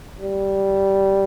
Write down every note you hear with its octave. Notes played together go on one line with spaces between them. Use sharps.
G3